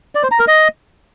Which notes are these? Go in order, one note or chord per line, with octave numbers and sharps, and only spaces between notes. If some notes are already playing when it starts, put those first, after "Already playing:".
D5
C5
A#5
A#4
D#5